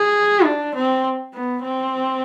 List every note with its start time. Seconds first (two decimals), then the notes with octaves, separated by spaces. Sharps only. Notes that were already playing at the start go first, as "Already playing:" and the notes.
Already playing: G#4
0.44 D4
0.75 C4
1.34 B3
1.63 C4